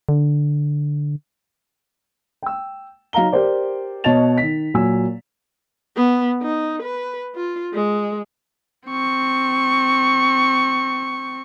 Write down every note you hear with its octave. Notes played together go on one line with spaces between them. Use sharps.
D3
G5 E6
F#3 D#4 F5 A#5 G7
G4 A#4 C5 D5
B2 C#5 D#5 A5 A6 F7
D#3 B6
A#2 F#3 G#5 E6
B3
D#4
B4
F4
G#3
C4 C#6